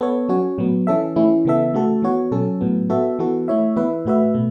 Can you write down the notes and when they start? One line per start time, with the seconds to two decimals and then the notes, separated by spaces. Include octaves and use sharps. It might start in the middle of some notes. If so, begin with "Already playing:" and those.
0.01 B3 A4 C#5
0.29 F#3 C#4 F#4 C#5
0.58 A2 F#3 B3
0.87 E3 C#4 A4 E5
1.16 E3 A3 C#4 E4
1.45 C#3 E3 B3 A4 E5
1.74 C#3 A3 F#4 A4
2.02 E3 B3 F#4 C#5
2.31 B2 F#3 C#4 A4
2.61 A2 F#3 B3
2.90 B3 F#4 A4 E5
3.19 E3 B3 F#4 A4
3.48 A3 E4 C#5 E5
3.76 E3 B3 E4 B4 E5
4.05 A2 A3 F#4 B4 E5
4.34 B2 A3